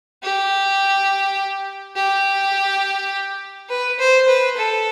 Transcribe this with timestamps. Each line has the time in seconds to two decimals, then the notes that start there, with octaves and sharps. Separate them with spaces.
0.23 G4
1.96 G4
3.70 B4
3.99 C5
4.29 B4
4.57 A4